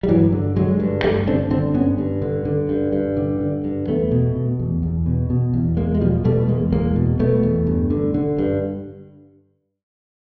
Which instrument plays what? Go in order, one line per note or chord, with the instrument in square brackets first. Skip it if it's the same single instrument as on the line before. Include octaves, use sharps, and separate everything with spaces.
[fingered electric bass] G3
G2 E3 F#3
D3
D3 F#3 G#3
G2
G2 G3 A3
D3 C4 D4
D3 C4 D4
G2 B3 C#4
G2
D3
D3
G2
G2
D3
D3
G2
E2 A3 B3
B2
B2
E2
E2
B2
B2
E2
E2 G#3 A#3
G#3
B2 F3 G3
B2 G3 A3
E2 G#3 A#3
E2 G#3 A#3
B2
B2 A3 B3
E2
G2
D3
D3
G2